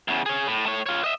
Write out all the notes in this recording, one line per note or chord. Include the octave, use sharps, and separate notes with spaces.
E2 C#3
G#4 C#5
A2
A3 C#5
F4 C#5
D#5 E5